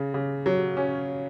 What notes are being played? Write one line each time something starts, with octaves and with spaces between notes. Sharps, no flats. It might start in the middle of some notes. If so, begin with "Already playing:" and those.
Already playing: C#3
C#3
F#3
C#4